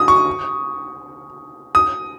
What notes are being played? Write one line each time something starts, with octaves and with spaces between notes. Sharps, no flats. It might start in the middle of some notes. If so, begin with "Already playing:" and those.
Already playing: D#6
C#6
D#6